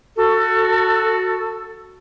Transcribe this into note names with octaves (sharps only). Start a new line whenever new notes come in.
F#4 A4